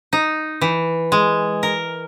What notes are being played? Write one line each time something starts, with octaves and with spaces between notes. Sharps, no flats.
D#4
E3
G#3
A#4